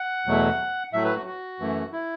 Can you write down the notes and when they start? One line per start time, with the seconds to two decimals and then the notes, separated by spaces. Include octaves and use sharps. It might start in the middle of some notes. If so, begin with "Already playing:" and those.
Already playing: F#5
0.26 E2 B2 F#3 A3
0.93 A2 F#3 A3 E5
1.05 B4
1.16 F#4
1.26 F#4
1.60 F#2 E3 A3
1.93 E4